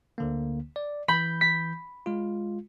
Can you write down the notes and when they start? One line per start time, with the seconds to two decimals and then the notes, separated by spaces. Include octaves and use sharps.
0.18 D2 D3 A#3
0.76 D5
1.08 E3 B5 G6
1.41 B6
2.06 G#3 F4